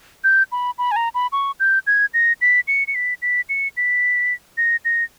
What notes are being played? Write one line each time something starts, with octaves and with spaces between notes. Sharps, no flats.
G6
B5
B5
G#5
A#5
B5
C#6
G6
G#6
A#6
B6
C#7
C#7
B6
B6
C#7
B6
A#6
A#6